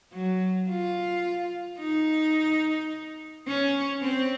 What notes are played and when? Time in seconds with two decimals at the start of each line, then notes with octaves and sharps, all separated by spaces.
0.12 F#3
0.69 F4
1.79 D#4
3.47 C#4
4.02 C4